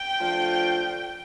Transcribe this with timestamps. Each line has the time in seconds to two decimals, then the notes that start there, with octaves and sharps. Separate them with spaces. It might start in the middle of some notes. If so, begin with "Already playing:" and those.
Already playing: G5
0.18 F3 A3 D4 F4